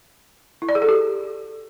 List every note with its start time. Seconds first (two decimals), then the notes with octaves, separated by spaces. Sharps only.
0.62 E4
0.69 D5
0.75 G#4
0.82 A4
0.89 G4